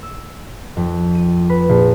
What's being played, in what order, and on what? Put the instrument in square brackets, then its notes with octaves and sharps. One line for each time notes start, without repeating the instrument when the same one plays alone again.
[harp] E6
F2
D#7
B4
A#1